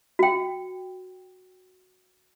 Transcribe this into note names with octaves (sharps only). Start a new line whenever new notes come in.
F#4 G5